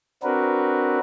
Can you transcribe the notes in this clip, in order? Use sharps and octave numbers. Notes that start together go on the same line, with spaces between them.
C4 D4 F#4 A#4 B4